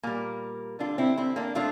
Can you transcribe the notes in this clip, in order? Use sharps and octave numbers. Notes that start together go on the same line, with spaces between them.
A#2 G3 A#3
D3 G3 D4 F4
C4 E4
C4 E4
A#3 D4
F3 A3 D4 F4